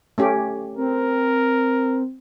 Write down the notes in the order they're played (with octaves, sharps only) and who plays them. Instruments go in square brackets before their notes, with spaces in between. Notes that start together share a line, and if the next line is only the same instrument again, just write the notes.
[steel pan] A3 C#4 G4
[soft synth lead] C4 [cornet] A#4